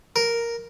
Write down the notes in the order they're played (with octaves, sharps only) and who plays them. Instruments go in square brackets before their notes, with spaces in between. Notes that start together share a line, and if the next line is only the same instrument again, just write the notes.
[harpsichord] A#4